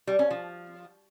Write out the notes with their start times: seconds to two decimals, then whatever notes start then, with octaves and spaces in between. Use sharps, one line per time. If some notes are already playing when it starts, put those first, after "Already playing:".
0.07 G3
0.19 C#4
0.31 F3